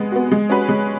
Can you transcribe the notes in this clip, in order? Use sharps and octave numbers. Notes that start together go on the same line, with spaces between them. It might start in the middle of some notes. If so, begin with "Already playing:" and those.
Already playing: G#3 B3
B3 F#4
G#3
C#4 F#4 B4
G#3